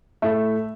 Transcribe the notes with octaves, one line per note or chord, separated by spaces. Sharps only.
A2 A3 E5